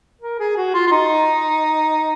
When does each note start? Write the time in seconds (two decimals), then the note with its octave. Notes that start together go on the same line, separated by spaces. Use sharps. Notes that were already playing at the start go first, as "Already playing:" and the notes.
0.22 A#4
0.39 G#4
0.57 F#4
0.74 F4
0.87 F4
0.92 D#4